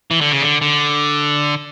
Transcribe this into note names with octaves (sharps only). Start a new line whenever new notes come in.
E3
D3
C#3
D3
D3